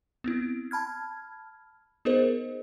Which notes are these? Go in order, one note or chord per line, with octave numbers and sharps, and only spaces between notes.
B3 C4 E4
A5 B5 F6 G#6
B3 D#4 G#4 A#4 C5 D#5